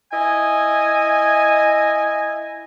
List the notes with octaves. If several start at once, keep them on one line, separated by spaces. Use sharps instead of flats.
E4 D#5 G#5